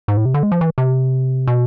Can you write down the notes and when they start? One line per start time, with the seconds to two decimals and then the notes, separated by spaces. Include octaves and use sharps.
0.08 G#2
0.17 A2
0.25 C3
0.34 D3
0.43 G#3
0.52 F3
0.61 E3
0.78 C3
1.47 B2